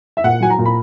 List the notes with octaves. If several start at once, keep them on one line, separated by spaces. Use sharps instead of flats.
E5
A#2 F#5
F#3 G#5
A#5
A#2
B5